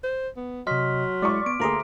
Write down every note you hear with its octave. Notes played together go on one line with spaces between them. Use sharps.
C5
B3
C3 F#3 D#5 C6 F6 B6
G#3 E4 D5 C#6 D6
B3 D7
D2 A#3 G#4 A4 A#5 C6